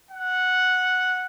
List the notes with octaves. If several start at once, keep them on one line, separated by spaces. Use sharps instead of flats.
F#5